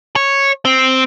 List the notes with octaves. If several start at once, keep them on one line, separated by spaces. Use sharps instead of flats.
C#5
C4